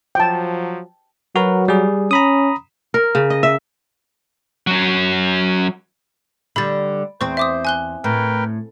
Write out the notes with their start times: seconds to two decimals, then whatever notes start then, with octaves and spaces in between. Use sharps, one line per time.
0.15 F3 F#3 G5 A5
1.36 F#3 F#4 A#4 B4
1.68 G3 G#4
2.11 C#4 A#5 B5 D#6
2.94 A#4
3.15 C#3
3.30 D#5
3.43 E5
4.67 F#3 C#4
6.56 D3 G3 B5 A6
7.21 E2 C4 C5 C#6
7.37 E5 D6 D#6
7.65 G#5 F#6 G7
8.04 A2 A#4 B4 G5